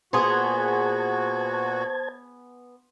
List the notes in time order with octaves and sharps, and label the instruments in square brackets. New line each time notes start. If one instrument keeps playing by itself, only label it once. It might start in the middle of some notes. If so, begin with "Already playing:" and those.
[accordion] A#2 F#4 [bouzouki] B3 G#4 [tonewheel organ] C5 A5 G#6 [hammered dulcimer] C6